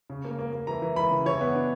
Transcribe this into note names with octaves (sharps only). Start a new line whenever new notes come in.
C#3
A#3
A#3
A#3
E3 A#5
E3
E3 B5
C#3
E3 C#5
B3
D4